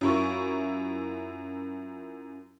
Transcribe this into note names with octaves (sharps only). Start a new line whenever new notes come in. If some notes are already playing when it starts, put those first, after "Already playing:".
F#2 C#4 E4 F4 A#4 C#6